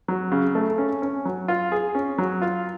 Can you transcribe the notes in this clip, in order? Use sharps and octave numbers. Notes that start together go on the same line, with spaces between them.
F#3
C#3
A3
C#4
C#4
F#3
F4
G#4
C#4
F#3
F4